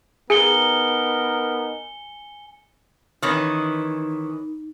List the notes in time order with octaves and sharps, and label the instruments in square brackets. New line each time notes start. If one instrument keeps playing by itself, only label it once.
[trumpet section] B3 D#4 A#4 [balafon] G#4 [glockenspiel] G#5 C#7 G7
[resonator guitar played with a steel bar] D#3 E3 C#4 [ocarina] D#4